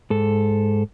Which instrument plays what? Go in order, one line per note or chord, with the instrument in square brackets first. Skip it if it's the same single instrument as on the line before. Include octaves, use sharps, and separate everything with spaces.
[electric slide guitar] G#2 A4